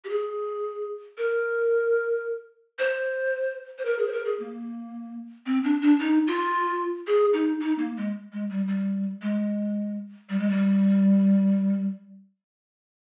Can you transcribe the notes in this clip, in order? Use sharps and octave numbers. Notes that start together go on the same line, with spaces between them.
G4
G#4
A#4
C5
C5
A#4
G#4
C5
A#4
G#4
A#3
C4
D4
D4
D#4
F4
G#4
D#4
D#4
A#3
G#3
G#3
G3
G3
G#3
G3
G#3
G3